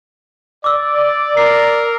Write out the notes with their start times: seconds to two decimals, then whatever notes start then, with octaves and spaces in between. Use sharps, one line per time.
0.64 D5 D6 E6
1.37 A#4 C7